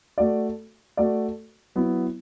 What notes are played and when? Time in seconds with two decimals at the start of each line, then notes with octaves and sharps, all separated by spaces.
0.18 A3 F#4 D5
0.97 A3 F#4 D5
1.75 F#3 B3 E4